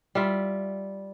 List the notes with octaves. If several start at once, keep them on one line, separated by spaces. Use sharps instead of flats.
G3 F4 E5